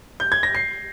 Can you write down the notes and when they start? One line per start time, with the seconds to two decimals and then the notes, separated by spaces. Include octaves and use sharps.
0.20 G6
0.32 G#6
0.43 A#6
0.55 C7